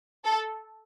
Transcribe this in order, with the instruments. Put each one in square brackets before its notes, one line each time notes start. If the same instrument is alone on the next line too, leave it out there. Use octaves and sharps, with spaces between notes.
[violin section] A4